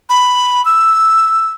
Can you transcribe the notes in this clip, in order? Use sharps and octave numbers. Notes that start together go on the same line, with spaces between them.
B5
E6